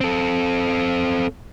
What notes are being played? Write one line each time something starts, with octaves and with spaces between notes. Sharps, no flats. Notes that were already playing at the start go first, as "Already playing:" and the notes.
C4 A4